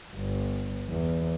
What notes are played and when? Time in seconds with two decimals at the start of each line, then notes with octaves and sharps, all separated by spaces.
0.15 G1
0.88 E2